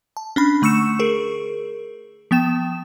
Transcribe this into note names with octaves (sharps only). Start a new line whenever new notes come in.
A5
C#4 D4 B5
D3 A3 C#6 E6 C#7 E7
G#4 A#4
F3 B3 G5 E7